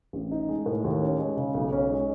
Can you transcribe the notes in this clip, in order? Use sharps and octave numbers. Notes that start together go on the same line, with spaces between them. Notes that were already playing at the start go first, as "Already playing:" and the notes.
A1
D#4
G#3
A2
D#2
C#4
G#3
C#3
B1
C#4
G#3